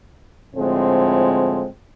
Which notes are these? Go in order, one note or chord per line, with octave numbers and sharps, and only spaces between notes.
A2 D3 F3 G#3 C4